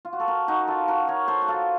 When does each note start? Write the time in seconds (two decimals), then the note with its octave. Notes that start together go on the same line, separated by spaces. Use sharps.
0.05 F4
0.13 F#4
0.20 A4
0.28 F#4 A#4
0.48 D#4 F#4
0.67 F4 A4
0.88 F#4 A#4
1.08 A#4 C#5
1.28 A4 C5
1.42 F#4
1.48 F4 A4